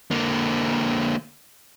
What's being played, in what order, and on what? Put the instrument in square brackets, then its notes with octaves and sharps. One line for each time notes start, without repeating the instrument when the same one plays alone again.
[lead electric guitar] D3 A#3